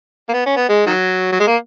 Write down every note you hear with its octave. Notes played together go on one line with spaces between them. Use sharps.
A#3
B3
C#4
B3
G#3
D#3 F#3
F#3
G#3
A#3